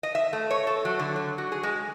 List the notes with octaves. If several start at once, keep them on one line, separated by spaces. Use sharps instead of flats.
D#5
E5
A3
C#5
A4
F#3
D3
F#3
F#4
G#4
G#3